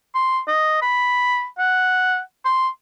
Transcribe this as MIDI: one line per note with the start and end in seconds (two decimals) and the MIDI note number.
0.14 0.40 84
0.48 0.77 75
0.81 1.46 83
1.58 2.19 78
2.45 2.68 84